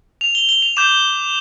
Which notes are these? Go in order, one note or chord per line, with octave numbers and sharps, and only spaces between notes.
F7
G7
G7
F7
D6 G6 E7